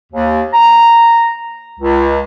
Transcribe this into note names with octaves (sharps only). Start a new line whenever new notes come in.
D#2
A#5
C#2